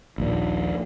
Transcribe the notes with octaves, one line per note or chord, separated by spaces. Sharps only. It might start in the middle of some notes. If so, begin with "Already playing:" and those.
A#1 D#2 A#2